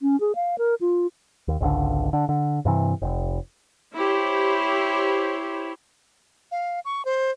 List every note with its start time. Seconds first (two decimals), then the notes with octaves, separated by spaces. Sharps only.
0.02 C#4
0.20 G#4
0.35 F5
0.58 A#4
0.81 F4
1.48 D#2
1.61 G#1 C#2 D3
2.13 D3
2.29 D3
2.65 G2 C3 E3
3.02 F1
3.95 E4 G4 C5 C#5
6.51 F5
6.85 C#6
7.05 C5